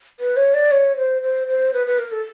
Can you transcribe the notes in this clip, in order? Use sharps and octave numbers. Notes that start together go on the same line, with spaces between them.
B4
C#5
D5
C#5
C5
C5
C5
B4
B4
A#4
A4